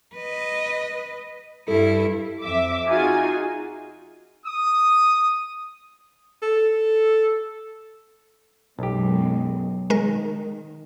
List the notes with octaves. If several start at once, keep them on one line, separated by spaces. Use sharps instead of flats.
B4 D#5
G2 E4 A4
F2 E5 D6
D#4 F4 F#4 G#4 G#5
D#6
A4
B1 F#2 B2 G#3 G4
D#3 G#3 A#4